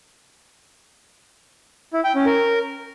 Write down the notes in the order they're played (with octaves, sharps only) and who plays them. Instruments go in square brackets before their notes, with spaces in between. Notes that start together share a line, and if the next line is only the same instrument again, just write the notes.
[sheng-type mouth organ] E4
G5
C#4
A#4